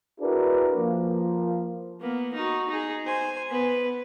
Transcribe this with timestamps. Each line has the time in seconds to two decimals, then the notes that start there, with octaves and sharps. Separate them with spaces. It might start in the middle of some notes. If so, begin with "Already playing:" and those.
0.21 D4 E4 F#4 G#4 A#4 B4
0.76 F3 A#3
2.00 A#3 B3
2.34 D#4 F#4
2.68 D#4 G#4
3.05 C5 G#5
3.50 B3 B4